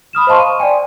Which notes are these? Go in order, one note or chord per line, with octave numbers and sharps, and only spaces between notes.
B5 D#6 F6 E7
C5 D#5 F5 A5 C6 C#6
D#7
D5 G5 G#5